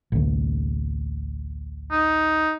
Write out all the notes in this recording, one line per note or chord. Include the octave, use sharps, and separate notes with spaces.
A1 D2
D#4